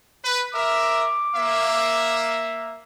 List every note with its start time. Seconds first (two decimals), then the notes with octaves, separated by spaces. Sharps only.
0.24 B4
0.54 A#4 E5 D6
1.35 A#3 E5